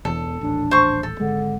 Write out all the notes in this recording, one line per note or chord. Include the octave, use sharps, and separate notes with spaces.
E1 E2 A4
D#1 A1 D4
C5 C#6
A4
G#1 D3 G#3